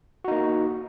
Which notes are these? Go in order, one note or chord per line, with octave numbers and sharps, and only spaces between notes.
A#3 D#4 F#4